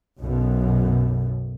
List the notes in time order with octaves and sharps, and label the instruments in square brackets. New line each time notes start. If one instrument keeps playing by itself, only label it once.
[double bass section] B1 F#2 B2